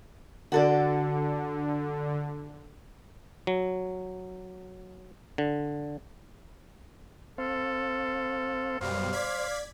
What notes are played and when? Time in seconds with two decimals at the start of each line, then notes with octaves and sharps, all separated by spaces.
0.52 D3 F#4 A4 D5
3.47 F#3
5.38 D3
7.38 C4 A4 C5 F5
8.81 F#2 B2 G3 C5 F5
9.13 D5 G#6 B6